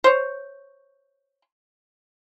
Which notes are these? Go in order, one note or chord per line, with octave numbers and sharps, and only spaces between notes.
C5 C#5